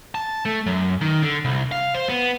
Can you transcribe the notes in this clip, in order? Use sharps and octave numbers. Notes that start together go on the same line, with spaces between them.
A5
A3
F#2
D#3
D3
C2
F5
C5
B3